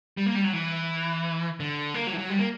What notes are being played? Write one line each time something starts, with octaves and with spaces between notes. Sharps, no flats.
G3
A#3
G3
F#3
E3
D3
A#3
F#3
E3
F#3
G3
A#3